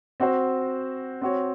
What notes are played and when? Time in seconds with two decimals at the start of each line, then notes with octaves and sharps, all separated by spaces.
0.20 C4 F#4 C5
1.21 C4 F#4 C#5